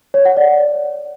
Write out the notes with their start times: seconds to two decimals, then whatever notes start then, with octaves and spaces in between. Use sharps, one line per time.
0.14 C#5
0.25 F#5
0.37 D5